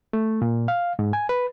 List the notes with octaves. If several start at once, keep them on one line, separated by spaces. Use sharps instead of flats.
A3
A#2
F5
G#2
G#5
B4